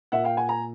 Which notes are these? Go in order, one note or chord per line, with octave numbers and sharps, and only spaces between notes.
A#2 E5 F#5
F5 G5
F#5 G#5
G#5 A#5